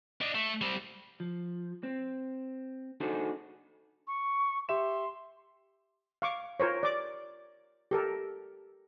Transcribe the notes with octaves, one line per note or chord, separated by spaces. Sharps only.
D4 D#4
A3
G3 C4
F3
C4
D4 D#4 F#4 G#4 A4 C5
C#6
G4 E5 C6 E7
F5 C#6 D6
F4 A#4 C5 C#5
D5 D6
G4 A4 A#4